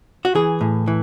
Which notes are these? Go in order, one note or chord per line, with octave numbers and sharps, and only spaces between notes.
F#4
E3 G#4
A2
E3